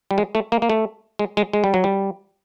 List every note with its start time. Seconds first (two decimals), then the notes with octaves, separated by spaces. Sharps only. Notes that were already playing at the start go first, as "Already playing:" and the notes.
0.11 G3
0.18 G#3
0.35 A3
0.52 A#3
0.62 A#3
0.70 A3
1.19 G#3
1.37 G#3
1.53 G#3
1.64 G3
1.74 F#3
1.84 G3